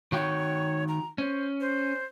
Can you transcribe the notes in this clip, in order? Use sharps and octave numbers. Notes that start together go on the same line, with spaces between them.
D#3 F#4 C#5 G5
A#5
C#4 C5
C5